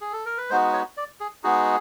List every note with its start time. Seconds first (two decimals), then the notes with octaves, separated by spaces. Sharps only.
0.00 G#4
0.13 A4
0.25 A#4
0.37 B4
0.50 G#3 B3 D#4 F#4 C5
0.73 C#5
0.97 D5
1.20 G#4
1.44 G#3 B3 D#4 F#4 G#4